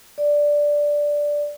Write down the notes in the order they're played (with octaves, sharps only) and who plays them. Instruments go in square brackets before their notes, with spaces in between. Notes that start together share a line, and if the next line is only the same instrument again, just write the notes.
[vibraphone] D5